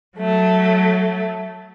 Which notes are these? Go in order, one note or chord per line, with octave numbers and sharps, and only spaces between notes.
F#3 A3